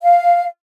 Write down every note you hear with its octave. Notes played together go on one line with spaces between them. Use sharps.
F5